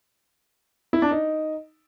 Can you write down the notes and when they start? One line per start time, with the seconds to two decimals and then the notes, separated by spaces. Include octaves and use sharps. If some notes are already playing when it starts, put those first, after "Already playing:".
0.93 E4
1.02 D4
1.11 D#4